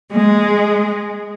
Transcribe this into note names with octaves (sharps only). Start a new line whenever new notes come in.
G#3